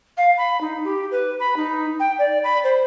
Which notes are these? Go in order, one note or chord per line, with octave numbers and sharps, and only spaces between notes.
F5
B5
D#4
G4
B4
B5
D#4
G5
D5
B5
C5